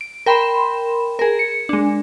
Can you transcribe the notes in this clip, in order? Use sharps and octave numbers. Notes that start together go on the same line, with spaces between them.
D7
A#4 G5 B5 C6 E7
G#4 A#4
C#7
G#3 D4